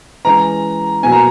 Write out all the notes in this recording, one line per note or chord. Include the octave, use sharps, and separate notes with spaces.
E3 G#3 C#4 A#5
B2 F#3 A#3 G#5
A#5